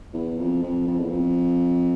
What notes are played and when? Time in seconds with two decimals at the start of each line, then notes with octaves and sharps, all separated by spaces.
0.13 E2
0.38 F2
0.63 F2
0.87 F2
0.99 E2
1.10 F2